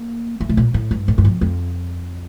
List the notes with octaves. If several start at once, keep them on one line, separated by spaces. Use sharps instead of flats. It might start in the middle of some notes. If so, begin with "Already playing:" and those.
Already playing: A#3
A3
C3
A#2
A2
G2
A2
G2
F2
F2